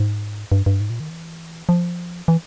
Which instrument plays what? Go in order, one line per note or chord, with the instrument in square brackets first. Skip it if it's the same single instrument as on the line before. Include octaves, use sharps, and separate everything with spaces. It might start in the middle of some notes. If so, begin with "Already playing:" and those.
Already playing: [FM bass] G#2
G2
G2
G#2
A#2
D#3
E3
F3
E3